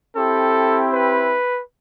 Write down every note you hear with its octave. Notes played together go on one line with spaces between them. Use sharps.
C4 E4 G4 A4
B4